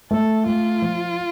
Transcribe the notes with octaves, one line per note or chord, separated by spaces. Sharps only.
A3 A4
A3 F4
F3